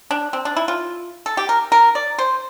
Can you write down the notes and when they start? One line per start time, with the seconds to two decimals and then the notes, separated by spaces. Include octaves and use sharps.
0.11 D4
0.33 C4
0.45 D4
0.57 E4
0.68 F4
1.26 A4
1.37 G4
1.49 A#4
1.72 A#4
1.95 D5
2.19 C5